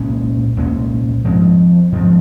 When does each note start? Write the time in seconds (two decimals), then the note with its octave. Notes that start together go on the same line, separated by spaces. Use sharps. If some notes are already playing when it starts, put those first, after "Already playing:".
Already playing: C2 A#2 G#3 C#4
0.57 C2 A#2 G#3 C#4
1.24 G#2 F3 G#3 C4
1.92 G#2 F3 G#3 C4